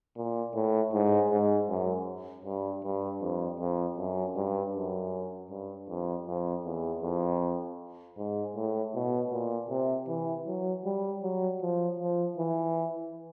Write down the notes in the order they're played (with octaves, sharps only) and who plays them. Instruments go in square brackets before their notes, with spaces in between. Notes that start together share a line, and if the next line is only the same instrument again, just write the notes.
[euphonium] A#2
A2
G#2
G#2
F#2
G2
G2
F2
F2
F#2
G2
F#2
G2
F2
F2
E2
F2
G#2
A2
B2
A#2
C3
E3
F#3
G3
F#3
F3
F3
E3